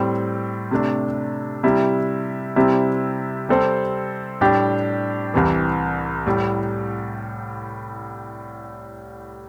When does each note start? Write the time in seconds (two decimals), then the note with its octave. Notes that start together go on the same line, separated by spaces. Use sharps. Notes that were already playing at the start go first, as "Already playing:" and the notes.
Already playing: A2 G3 C4
0.71 C3 A3 D4
1.63 C3 G3 E4
2.56 C3 G3 C4 E4
3.49 C3 G3 C4 A4 C5
4.41 A2 G3 D4 G4
5.34 C2 C3 E3
6.26 A2 G3